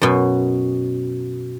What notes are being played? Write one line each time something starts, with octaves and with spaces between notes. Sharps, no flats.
F#2 B2